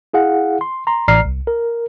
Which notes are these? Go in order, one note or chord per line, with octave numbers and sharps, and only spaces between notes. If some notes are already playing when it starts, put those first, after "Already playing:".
E4 G#4 F5 F#5
C6
A#5 C6
A1 D5 A#5 F6 C7
C2
A#4